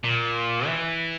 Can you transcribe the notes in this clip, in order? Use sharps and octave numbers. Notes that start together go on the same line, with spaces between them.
A#2
E3